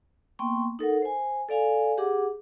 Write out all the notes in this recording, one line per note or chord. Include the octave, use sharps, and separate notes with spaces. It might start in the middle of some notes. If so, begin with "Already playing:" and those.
A#3 B3 G5 C6 C#6
D#4 A4 A#4 F#5
C5 G#5
A4 D5 F5 G#5
G4 G#4 F#5 D6